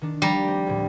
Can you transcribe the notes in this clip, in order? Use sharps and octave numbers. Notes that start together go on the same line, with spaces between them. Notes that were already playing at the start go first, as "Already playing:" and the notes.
D#3 D4
F3 G3 D5 A#5
A3 C4
D2 A2